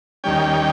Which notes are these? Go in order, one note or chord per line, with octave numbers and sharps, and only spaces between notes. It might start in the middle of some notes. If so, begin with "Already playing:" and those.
D#2 D#3 G3 C#4 G5